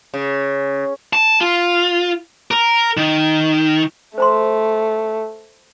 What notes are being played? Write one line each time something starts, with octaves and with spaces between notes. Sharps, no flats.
C#3
A5
F4
A#4
D#3
A3 C5 A#5 C6